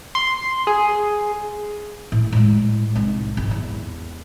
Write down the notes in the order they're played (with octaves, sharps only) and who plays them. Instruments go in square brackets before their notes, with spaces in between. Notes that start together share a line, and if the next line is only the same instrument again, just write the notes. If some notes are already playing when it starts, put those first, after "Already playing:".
[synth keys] C6
G#4
[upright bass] A2
A2 G#3
C2 D#4
G#1
E2